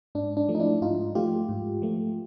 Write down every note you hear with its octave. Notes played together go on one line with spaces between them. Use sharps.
G#2 D4
D4
F3 A3
D#4
D4 E4
G#2 D#4 F4
F3 A3 F4 G4
G#2
F3 A3